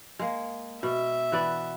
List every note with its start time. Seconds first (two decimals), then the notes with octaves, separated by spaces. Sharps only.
0.19 G#3 A#3
0.83 B2 E5
1.32 E3 B3 D5